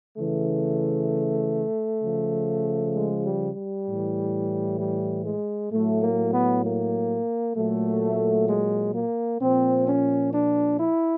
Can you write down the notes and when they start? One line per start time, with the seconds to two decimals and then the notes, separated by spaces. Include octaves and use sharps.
0.17 C#3 E3 A3
2.02 C#3 F3
2.95 G#3
3.25 G3
3.56 G3
3.87 A2 E3
4.80 G3
5.26 G#3
5.72 A2 F#3 A3
6.02 A#3
6.33 B3
6.64 A#3
7.56 A#2 F#3 A3
8.49 G#3
8.95 A#3
9.41 A#2 F3 C4
9.88 C#4
10.34 D4
10.80 E4